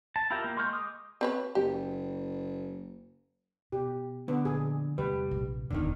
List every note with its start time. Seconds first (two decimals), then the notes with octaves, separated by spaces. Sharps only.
0.16 A5
0.30 E4 F4 G4 A#4 G5
0.44 A#3
0.57 G#3 C6 C#6 F6 G6
0.73 G#3 D6 D#6
1.21 C4 B4 C#5
1.55 F#1 G4
3.72 B2 G4
4.28 D3 B3
4.45 A#2 F3 G#4
4.98 E2 C3 G3 A3 B4
5.31 A#1 C3
5.70 D#1 B1 F2 D3 D#3 B3